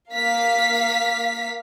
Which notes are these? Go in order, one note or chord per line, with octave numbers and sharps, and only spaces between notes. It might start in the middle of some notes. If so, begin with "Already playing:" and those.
A#3 F5 B6